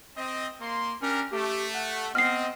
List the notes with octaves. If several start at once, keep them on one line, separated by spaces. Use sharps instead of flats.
C4 D#5
A#3 C6
C#4 D4 G4 A#4
A3 G4
F#5
B3 C4 D#5 F6 C7